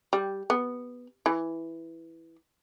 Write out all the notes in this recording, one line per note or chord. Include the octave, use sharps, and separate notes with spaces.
G3
B3
E3